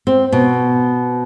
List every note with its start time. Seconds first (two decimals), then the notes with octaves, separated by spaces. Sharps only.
0.07 C4
0.32 B2